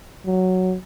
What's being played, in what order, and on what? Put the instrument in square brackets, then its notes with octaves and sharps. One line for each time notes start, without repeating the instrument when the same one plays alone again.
[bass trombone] F#3